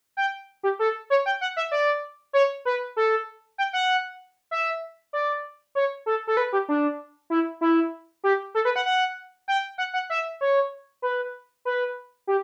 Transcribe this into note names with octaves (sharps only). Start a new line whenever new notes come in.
G5
G4
A4
C#5
G5
F#5
E5
D5
C#5
B4
A4
G5
F#5
E5
D5
C#5
A4
A4
B4
G4
D4
E4
E4
G4
A4
B4
F#5
F#5
G5
F#5
F#5
E5
C#5
B4
B4
G4